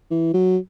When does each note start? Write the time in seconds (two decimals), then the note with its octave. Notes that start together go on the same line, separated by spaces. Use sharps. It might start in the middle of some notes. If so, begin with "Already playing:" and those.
0.11 E3
0.34 F#3